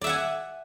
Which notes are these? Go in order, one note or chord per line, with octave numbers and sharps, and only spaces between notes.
D5 E5 F#5 G#5